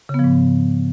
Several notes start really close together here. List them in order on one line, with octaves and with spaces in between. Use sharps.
C#3 B3 F3 G#2